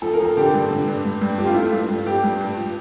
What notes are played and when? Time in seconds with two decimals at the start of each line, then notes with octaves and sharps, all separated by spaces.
0.02 F3 A4
0.13 A#4
0.19 F3
0.25 A4
0.37 D3 G4
0.54 G2
0.70 D3
0.87 G2
1.05 G2
1.21 G2
1.38 F3 G4
1.46 F4
1.54 A3 E4
1.62 F4
1.73 G2
1.89 G2
2.06 G2 G4
2.24 G2
2.40 G2
2.57 F3